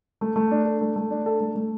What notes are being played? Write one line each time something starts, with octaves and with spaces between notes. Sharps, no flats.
A3
A3
D4
A4
A3
A3
D4
A4
A3
A3